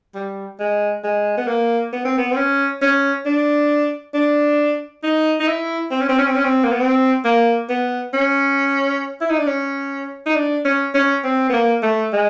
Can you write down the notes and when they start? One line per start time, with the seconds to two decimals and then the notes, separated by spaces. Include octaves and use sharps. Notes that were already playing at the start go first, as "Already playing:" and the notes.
0.15 G3
0.60 G#3
1.04 G#3
1.37 B3
1.48 A#3
1.93 B3
2.05 C4
2.18 B3
2.32 C4
2.36 C#4
2.81 C#4
3.26 D4
4.14 D4
5.03 D#4
5.40 D#4
5.48 E4
5.91 C4
6.01 C#4
6.09 C4
6.18 C#4
6.27 C4
6.36 C#4
6.44 C4
6.64 A#3
6.72 B3
6.80 C4
7.25 A#3
7.70 B3
8.14 C#4
9.21 E4
9.30 D#4
9.39 D4
9.47 C#4
10.26 D#4
10.36 D4
10.65 C#4
10.94 C#4
11.24 C4
11.50 B3
11.53 A#3
11.83 A3
12.13 G#3